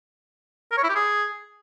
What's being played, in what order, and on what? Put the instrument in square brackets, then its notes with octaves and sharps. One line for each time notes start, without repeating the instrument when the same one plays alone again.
[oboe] A#4
C#5
E4
G4
G#4